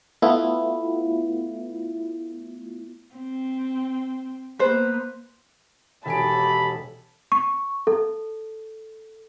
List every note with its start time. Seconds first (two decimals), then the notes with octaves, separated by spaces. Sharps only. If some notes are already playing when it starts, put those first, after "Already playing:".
0.22 A3 B3 E4 F4
3.14 C4
4.59 A#3 B3 B4 C5
6.06 E1 D#2 D#3 G4 A4 G#5 B5 D7
7.32 C#6
7.87 A4